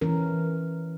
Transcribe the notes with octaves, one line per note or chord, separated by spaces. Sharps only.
E3 C#4 A#4